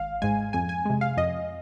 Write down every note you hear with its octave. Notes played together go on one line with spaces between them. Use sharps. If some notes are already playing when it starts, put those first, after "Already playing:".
Already playing: G#1 F5
G#2 G#3 G#5
F2 G#5
G#5
C3 G#3
F5
F2 D#5